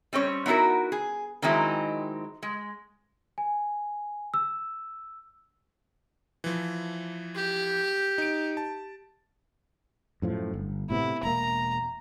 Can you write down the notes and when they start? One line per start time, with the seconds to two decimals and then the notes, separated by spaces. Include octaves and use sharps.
0.13 G3 C4 C#4 C#5
0.46 B3 D#4 E4 F#4 A#4
0.92 G#4
1.42 D#3 F#3 G#3 C4 D#4 E4
2.43 G#3
3.38 G#5
4.34 E6
6.44 E3 F3
7.35 G4
8.18 D#4 D7
8.57 A5
10.22 F#2 A2 F3
10.54 G1
10.90 A2 C3 B3 E4
11.23 E1 A#3 A#5